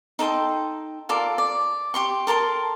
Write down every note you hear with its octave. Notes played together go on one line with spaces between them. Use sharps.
D#4 A4 G5 C6
F4 A4 A#4 D5
D5
G4 C6 C#6
A4 A#4 A5 C6